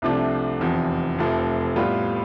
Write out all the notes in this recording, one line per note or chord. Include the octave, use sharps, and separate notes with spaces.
C2 C3 F3 A3 D4
F1 E2 C3 F3
F1 F2 C3 F3 A3
A2 G3 B3 F4